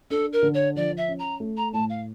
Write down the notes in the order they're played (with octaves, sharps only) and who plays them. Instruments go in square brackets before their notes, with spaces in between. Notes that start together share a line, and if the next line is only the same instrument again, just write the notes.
[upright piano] D4 [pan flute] A4
[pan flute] A#4
[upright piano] D3
[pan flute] C#5
[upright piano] F3 [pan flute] D5
[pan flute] E5
[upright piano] C#4
[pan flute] A#5
[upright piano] A3
[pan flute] A#5
[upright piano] A2 [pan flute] A5
[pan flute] F5